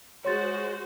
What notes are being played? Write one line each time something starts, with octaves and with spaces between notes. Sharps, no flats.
G#3 F#4 C5 C#5 C6 A6